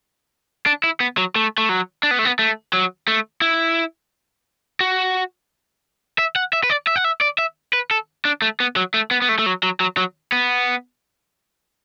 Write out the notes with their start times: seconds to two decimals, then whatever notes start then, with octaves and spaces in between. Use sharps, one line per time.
0.66 D4
0.84 E4
1.00 B3
1.18 F#3
1.36 A3
1.58 A3
1.69 F#3
2.03 D4
2.11 B3
2.19 A3
2.25 B3
2.39 A3
2.73 F#3
3.08 A3
3.42 E4
4.81 F#4
6.19 E5
6.36 F#5
6.53 E5
6.64 B4
6.70 D5
6.87 E5
6.96 F#5
7.04 E5
7.21 D5
7.39 E5
7.73 B4
7.91 A4
8.25 D4
8.42 A3
8.60 B3
8.76 F#3
8.94 A3
9.11 B3
9.22 B3
9.29 A3
9.39 A3
9.46 F#3
9.63 F#3
9.80 F#3
9.97 F#3
10.32 B3